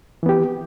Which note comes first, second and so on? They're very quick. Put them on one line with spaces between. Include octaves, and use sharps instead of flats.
E3 B3 G4